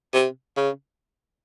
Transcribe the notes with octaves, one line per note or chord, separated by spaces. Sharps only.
C3
C#3